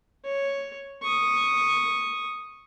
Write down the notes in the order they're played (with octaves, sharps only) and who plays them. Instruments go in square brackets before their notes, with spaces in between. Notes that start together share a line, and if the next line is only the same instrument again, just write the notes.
[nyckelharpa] C#5
C#6 D#6